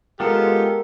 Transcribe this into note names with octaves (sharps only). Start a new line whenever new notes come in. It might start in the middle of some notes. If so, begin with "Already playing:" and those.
G#3 B3 F4 G4 A4 A#4